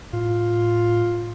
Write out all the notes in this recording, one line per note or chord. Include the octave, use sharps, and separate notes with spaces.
A2 F4